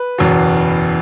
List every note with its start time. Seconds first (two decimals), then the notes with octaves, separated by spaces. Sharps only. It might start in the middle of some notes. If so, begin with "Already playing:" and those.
Already playing: B4
0.18 F#1 E2 B2